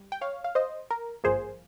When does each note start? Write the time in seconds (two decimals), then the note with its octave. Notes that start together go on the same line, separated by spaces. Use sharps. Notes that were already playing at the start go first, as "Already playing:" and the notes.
Already playing: G3
0.12 G5
0.21 C#5 F5
0.44 F5
0.55 C5 D#5
0.91 A#4
1.24 G#1 G2 F3 A#3 G#4 C5